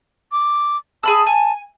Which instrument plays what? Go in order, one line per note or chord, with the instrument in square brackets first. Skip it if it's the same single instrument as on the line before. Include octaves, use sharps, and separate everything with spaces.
[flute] D6
[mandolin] G#4 B5 E6 [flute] A5
[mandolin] G#5